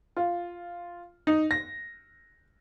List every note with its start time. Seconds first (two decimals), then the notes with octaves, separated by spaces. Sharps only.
0.17 F4
1.27 D#4
1.51 A#6